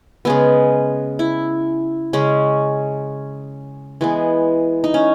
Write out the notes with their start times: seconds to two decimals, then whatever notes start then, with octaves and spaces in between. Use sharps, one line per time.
0.25 C#3 G#3 B3
1.19 E4
2.13 C#3 G#3 C#4
4.01 E3 G#3 B3
4.84 D#4
4.94 C#4